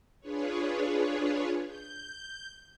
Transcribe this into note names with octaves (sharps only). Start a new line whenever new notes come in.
D4 F4 G#4 B4 C#5
G6